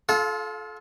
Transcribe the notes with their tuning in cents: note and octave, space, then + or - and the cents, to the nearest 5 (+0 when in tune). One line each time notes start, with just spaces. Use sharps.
F4 +0 A4 -30 F5 +35